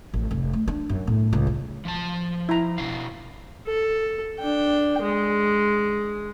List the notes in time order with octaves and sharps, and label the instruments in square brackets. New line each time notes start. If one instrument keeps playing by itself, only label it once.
[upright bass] A1
F1
A3
D4
F#2
A2
C#2
C#3
[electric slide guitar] F3 A5
[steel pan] E4 A#5
[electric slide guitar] B2 D4 F5
[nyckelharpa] A4
D4 G5
G#3